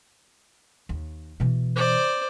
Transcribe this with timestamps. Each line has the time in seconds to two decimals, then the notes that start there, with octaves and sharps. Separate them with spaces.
0.89 D#2
1.40 B2 E3
1.76 C5 D5